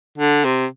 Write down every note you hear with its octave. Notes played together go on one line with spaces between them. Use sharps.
D3
C3